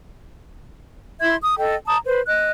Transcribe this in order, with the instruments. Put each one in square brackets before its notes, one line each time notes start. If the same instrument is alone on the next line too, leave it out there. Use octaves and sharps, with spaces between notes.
[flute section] E4 E5 C6 G#6
D#6
A4 D#5 G5
A5 A#5 D#6
B4 C5
D#5 F#6